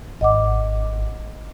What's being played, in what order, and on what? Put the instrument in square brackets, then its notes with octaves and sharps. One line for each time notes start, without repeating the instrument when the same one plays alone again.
[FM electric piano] G#1 [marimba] D#5 F#5 D6